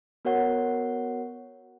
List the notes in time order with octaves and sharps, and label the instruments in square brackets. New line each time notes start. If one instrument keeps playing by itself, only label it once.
[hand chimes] B3 F#4 A#4 C#5 F#5